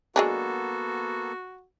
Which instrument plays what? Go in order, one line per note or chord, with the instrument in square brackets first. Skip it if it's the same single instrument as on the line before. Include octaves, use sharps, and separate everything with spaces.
[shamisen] F#3 G#3 D4 [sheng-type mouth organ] A#3 B3 A4 [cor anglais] F#4